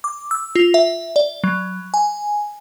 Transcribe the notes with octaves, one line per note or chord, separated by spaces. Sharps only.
D6
E6
F4
E5
D5
F#3
G#5